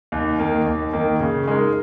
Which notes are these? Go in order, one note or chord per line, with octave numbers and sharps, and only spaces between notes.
D#2
D#3 A#3
D#2
D#3 A#3
C#3
G#3 D#4 A#4